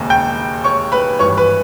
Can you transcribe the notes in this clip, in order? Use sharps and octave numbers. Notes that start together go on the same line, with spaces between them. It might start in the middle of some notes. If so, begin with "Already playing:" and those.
Already playing: E1 D#2 C#3 G#3
G5 G6
C#5 C#6
B4 B5
G#1 G2 E3 C#5 C#6
B4 B5